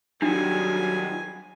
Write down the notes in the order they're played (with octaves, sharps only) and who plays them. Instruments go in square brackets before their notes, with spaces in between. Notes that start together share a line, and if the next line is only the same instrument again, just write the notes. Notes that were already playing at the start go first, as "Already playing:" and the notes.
[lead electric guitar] D#3 G3 [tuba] F#3 [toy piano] D4 [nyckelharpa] G#5